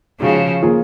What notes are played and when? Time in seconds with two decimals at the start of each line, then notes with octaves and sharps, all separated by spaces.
0.20 C#3 F3 G#3 D#4 F#4
0.62 F3 A#3 F4 G#4